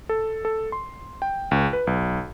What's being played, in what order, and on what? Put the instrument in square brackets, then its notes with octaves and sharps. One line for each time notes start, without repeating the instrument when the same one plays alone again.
[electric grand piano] A4
A4
C6
G5
C#2
B4
B1